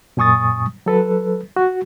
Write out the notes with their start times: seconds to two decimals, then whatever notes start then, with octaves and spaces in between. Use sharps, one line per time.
0.17 F#2 A#2 G#5 C#6 D#6 A6
0.86 F#3 A4 B4
1.56 F#4